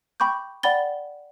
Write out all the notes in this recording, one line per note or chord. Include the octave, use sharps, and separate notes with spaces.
G5 B5 C#6 D6 G6
D5 F#5 G5 B5 A6 G7